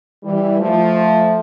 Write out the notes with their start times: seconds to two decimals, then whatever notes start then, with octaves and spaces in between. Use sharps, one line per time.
0.24 E3 G3
0.60 F3 A3